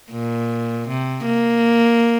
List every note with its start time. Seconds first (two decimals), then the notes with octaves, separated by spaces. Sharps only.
0.11 A#2
0.88 C3
1.25 A#3